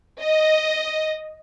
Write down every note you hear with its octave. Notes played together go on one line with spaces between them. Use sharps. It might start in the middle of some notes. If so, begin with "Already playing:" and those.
D#5